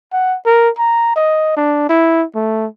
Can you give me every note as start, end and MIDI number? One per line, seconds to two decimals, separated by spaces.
0.13 0.37 78
0.46 0.69 70
0.78 1.13 82
1.16 1.55 75
1.57 1.85 62
1.89 2.24 64
2.35 2.66 57